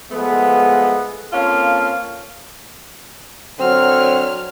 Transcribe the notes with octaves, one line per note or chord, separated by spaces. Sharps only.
F3 G#3 A3 B3
A#3 C4 C#4 F4 A4 F5
D3 F#3 C4 C#5 F6